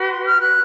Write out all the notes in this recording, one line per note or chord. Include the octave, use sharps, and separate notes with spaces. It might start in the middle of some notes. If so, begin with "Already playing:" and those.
Already playing: F#4 B4
C6
F6
F#6